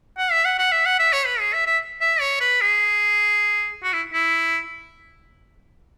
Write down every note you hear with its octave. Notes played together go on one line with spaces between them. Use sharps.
F#5
E5
F#5
F#5
E5
F#5
E5
C#5
B4
G#4
E5
E5
E5
C#5
B4
G#4
F#4
E4
E4